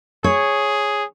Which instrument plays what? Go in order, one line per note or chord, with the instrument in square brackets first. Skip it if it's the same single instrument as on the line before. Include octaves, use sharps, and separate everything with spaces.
[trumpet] G#4 [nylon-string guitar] C#5